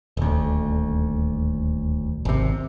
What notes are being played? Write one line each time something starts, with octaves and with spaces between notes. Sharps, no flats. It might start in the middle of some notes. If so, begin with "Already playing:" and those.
D#1 D2
G#1 C3